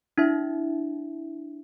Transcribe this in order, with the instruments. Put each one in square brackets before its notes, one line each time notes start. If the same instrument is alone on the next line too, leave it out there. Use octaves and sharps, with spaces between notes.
[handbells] D4 E4 E5